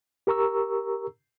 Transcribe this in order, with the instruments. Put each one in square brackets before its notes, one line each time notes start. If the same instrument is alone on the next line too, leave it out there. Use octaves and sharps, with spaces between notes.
[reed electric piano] G4 A#4 A#5 C#6 E6